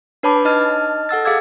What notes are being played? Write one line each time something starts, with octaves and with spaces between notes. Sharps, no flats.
D4 B4 C#5 A5 B5 D6
D#4 D#5 A5 F6
A4 F#5 E6 A6
G#4 F5 D6 E6 G#6